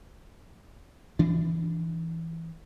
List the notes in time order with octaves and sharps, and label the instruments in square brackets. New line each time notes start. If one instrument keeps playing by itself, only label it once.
[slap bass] E3 D4